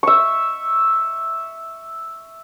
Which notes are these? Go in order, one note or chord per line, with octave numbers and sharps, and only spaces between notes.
E5 C#6